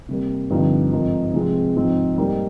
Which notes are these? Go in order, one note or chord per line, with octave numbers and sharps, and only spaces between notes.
C3 G3 A#3
G2 D3 F3 C4 D#4
G#2 F3 C4 D#4 A#4
C3 F3 G#3 C4
G#2 F3 C4
G#2 G3 A#3 D#4